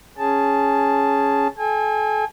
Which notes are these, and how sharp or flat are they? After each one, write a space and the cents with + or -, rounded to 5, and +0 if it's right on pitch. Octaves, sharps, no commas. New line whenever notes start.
C#4 +0 G#4 +0 A5 -5
A4 -40 G#5 -35